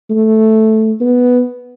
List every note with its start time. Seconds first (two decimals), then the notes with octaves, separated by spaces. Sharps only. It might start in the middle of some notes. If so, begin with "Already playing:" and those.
0.10 A3
1.01 B3